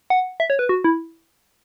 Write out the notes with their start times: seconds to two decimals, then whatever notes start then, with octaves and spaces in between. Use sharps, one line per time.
0.10 F#5
0.40 E5
0.50 C#5
0.59 B4
0.69 F#4
0.84 E4